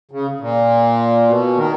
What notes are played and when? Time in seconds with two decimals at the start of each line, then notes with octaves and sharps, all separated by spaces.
0.11 C#3
0.40 A#2
1.27 B2
1.57 D#3